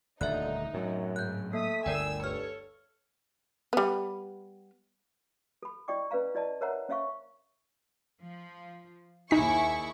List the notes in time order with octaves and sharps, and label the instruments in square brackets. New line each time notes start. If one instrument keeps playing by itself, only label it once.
[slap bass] D#1 D2 [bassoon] D3 [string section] D#4 [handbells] E5 F#6
[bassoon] F#2 [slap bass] A2 F#3
[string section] G#2 C#3 [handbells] F#6 G6
[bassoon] A3 [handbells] A#3 [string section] D#6 B6
[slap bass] G1 D2 [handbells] A#4 D5 G5 [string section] G#5 E6
[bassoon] G2 [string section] A4 C#5 [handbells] F6
[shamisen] G3 B3
[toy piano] A4 B5
E4 D5 D#5 G5 C#6 D6
C#4 B4 D5 F5 A#5
E4 D5 D#5 A5
A#4 C5 C#5 E5 F#5 A#5
C#4 C#5 E5 F5 C#6
[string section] F3
[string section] D#2 E4 C#6 [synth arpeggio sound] D#4 B6 [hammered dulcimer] G#4